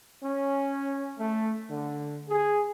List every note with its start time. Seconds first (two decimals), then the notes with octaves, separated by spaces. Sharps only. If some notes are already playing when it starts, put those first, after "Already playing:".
0.22 C#4
1.18 A3
1.70 D3
2.29 G#4